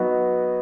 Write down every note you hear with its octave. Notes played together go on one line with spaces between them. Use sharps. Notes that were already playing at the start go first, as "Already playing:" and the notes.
Already playing: F#3 B3 D#4 F#4